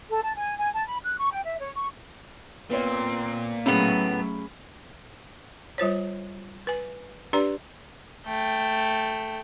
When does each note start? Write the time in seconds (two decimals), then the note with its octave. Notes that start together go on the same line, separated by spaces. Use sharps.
0.09 A4
0.23 A5
0.35 G#5
0.57 G#5
0.73 A5
0.87 B5
1.03 F#6
1.17 C#6
1.31 G5
1.44 E5
1.59 C#5
1.76 C#6
2.70 A#2 B3 C4 C#5
3.66 A2 F#3 A3 B3 C#4 G#4 B5
5.78 G3 F4 C5 C#5
6.67 B4 G#5
7.33 D4 G4 B4 D5 A#5
8.26 A3 G5